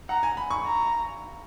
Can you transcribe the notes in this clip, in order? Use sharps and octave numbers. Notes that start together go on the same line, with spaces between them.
F#5 A#5
G#5
B5
C#6
A#5